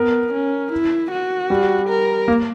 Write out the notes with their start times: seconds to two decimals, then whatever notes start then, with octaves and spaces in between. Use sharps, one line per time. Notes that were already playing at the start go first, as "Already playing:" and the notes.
Already playing: B3 A#4
0.33 C#4
0.72 E4
1.12 F#4
1.50 G3
1.89 A#4
2.28 A#3